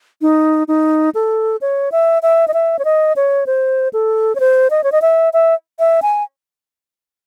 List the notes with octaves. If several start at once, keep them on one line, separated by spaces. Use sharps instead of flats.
D#4
D#4
A4
C#5
E5
E5
D#5
E5
C#5
D#5
C#5
C5
A4
C#5
C5
D#5
C#5
D#5
E5
E5
E5
G#5